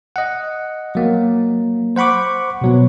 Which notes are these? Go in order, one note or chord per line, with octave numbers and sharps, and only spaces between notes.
D#5 F#5
F#3 A#3
C5 F#5 B5 C#6 D6
B2 F#3 B3